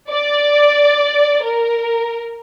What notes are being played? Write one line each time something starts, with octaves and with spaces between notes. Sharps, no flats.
D5
A#4